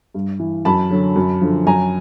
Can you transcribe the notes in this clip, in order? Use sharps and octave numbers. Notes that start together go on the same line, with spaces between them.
G2
E3
F#2 A5 B5
D3 F#3
F#2
D3 F3
F#2 G#5 A#5